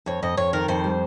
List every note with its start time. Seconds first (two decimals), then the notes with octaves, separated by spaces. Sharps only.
0.06 F2 C#5
0.22 F2 D#5
0.37 F2 C#5
0.53 D#3 A#4
0.68 F2 C5
0.84 G3